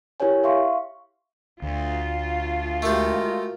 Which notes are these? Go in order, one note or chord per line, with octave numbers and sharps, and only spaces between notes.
E4 G4 A#4 C#5 G#5
E5 F5 C6 C#6
D2 F4
G#3 A3 F#4 G4 A#4